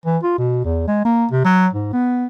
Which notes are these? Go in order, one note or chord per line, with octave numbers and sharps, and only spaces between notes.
E3
F4
B2
E2
G#3
A#3
C3
F#3
G#2
B3